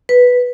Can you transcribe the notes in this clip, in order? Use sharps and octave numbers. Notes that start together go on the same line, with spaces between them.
B4